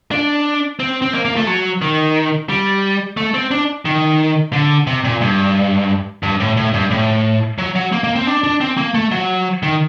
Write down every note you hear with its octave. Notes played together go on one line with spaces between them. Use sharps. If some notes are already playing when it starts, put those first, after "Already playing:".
D4
C4
C4
A#3
A#3
A3
F#3
D#3
G3
A3
C4
D4
D#3
D3
C3
A#2
G2
G2
A2
A2
G2
A2
F#3
F#3
A#3
A#3
C4
D4
D4
C4
A#3
A3
F#3
D#3